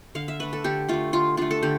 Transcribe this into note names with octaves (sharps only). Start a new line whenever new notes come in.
D3 F5
E5
A3 D4 B4
A4
D3 G4
A3 D4 F4
D3 F4
A3 D4 F4
A4
D3 G4